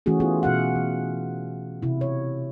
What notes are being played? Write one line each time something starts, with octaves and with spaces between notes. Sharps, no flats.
E3 A3 C#4 F#4 G#4
B3 F4 G#4
B2 F#4 F5 F#5
E3
C3 E4
C#5